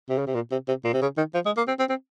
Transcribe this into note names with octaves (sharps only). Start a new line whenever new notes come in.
C3
C#3
C3
A#2
C3
C3
A#2
C3
C#3
D#3
F3
G#3
A#3
C4
C4
C4